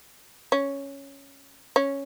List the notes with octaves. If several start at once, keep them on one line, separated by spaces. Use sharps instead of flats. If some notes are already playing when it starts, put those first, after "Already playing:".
C#4
C#4